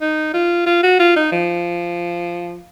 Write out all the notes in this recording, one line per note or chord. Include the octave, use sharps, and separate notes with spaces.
D#4
F4
F4
F#4
F4
D#4
F3